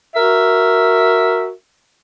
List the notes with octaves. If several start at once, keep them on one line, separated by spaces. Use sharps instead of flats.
F#4 A#4 E5